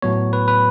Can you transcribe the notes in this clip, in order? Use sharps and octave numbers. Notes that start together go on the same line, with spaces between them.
A2 F#3 B3 C#5
B4
B4